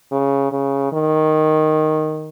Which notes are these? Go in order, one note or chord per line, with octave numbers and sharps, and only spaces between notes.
C#3
C#3
D#3